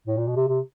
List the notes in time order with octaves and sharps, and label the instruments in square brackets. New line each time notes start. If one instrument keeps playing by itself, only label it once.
[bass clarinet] A2
A#2
B2
C3
C3